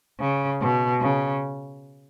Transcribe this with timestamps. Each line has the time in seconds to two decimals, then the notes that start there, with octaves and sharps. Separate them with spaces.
0.20 C#3
0.61 B2
1.01 C#3